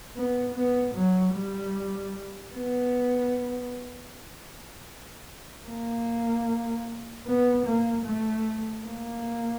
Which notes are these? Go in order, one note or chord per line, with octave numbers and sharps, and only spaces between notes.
B3
B3
F#3
G3
B3
A#3
B3
A#3
A3
A#3